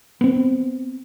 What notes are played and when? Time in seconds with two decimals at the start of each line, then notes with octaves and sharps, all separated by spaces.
0.21 B3 C4